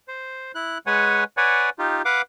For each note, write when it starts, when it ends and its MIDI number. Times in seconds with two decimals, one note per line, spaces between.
0.08 0.52 72
0.55 0.78 64
0.55 0.78 90
0.86 1.24 56
0.86 1.24 71
0.86 1.24 73
0.86 1.24 78
0.86 1.24 80
1.37 1.70 71
1.37 1.70 73
1.37 1.70 74
1.37 1.70 78
1.37 1.70 80
1.79 2.02 63
1.79 2.02 65
1.79 2.02 67
2.05 2.22 71
2.05 2.22 77
2.05 2.22 78
2.05 2.22 86